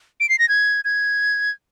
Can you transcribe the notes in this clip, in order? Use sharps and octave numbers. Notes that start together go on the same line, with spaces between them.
D7
C7
A#6
G#6
G#6